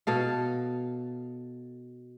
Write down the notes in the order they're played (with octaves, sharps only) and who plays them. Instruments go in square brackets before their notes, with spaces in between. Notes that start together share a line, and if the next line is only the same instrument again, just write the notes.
[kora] B2 A4 F5